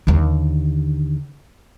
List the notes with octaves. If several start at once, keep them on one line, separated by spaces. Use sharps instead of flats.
D#2 D3